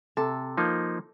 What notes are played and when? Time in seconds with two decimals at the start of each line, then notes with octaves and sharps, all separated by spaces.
0.17 C3 A4
0.57 F3 A#3 D#4